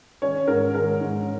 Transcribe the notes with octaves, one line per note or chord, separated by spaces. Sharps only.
C#4 C#5
G#2 A#4
G#3 A#4
G#2